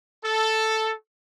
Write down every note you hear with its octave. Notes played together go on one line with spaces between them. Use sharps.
A4